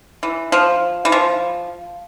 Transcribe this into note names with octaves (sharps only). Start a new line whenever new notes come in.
E3
F3
E3
F3